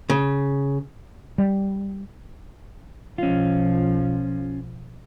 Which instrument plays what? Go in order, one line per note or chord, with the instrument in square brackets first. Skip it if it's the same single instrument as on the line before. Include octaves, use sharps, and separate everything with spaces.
[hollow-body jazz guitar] C#3
[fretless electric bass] G3
[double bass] B1 F3 [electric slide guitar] C#4 F4